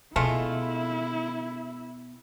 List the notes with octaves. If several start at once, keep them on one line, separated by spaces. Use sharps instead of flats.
B2 G#3 A3 B3 E4 F4